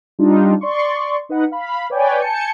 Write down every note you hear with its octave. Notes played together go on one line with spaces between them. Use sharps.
G3 D4 D#4 F4
D5 C6 C#6
D#4 B4 D#5 F#5
F5 B5
B4 C#5 D5 G5 G#5
G#5 A5 G6 C#7